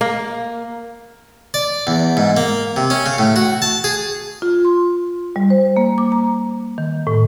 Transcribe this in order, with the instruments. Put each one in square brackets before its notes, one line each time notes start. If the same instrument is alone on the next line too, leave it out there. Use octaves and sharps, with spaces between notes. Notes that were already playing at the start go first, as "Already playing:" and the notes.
[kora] A#3
[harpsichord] D5
E2
G#2
A#3
C3
C#4
C#3
A2
F#4
A5
G#4
[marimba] F4
C6
G3
C5
A#3
D6
A#5
D#3
A2